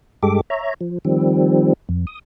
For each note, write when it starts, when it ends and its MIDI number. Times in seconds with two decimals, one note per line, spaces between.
0.23 0.41 43
0.23 0.41 56
0.23 0.41 67
0.23 0.41 69
0.23 0.41 86
0.50 0.74 73
0.50 0.74 76
0.50 0.74 82
0.81 0.98 53
1.05 1.73 51
1.05 1.73 53
1.05 1.73 55
1.05 1.73 60
1.89 2.05 41
2.07 2.19 87